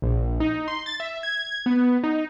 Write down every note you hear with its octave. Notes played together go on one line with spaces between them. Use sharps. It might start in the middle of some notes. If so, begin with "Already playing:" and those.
A#1
D#4
C6
A6
E5
G#6
B3
D#4